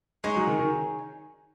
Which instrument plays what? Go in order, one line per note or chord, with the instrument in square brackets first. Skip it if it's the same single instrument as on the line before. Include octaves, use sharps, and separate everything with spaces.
[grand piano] G#3 [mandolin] D#4 G#4 C#5
[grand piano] F#3
D#3
D#3